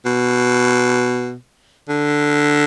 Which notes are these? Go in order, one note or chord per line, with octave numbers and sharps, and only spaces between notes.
B2
D3